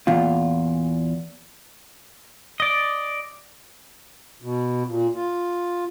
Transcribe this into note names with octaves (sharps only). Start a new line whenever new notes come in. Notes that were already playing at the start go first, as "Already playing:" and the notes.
E2 A#2 F4
D5 D#5
B2
A#2
F4